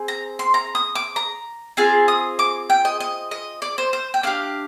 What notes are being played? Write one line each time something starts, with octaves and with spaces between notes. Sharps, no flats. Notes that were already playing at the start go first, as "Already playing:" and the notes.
Already playing: C4 G#4
A#5
C6
A#5
D#6
D6
A#5
C4 F4 G#4 G#5
D#6
D6
G5
D#5
D#5
D#5
D5
C5
C5
G5
D4 G4 F5